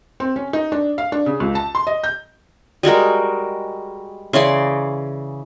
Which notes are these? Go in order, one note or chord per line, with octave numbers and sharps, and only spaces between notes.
C4
C#4
D#4
D4
F5
D4
C#3
C#2
A5
C6
D#5
G6
G3 G#3 F#4 A#4
C#3 E3 D5 C6